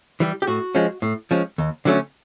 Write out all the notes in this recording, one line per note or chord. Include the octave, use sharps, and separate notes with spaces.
E3 G3
G4
A2 F#4
F3 G#3 C#4
A2
F3 G#3 C#4
D#2
D3 F#3 A3 C#4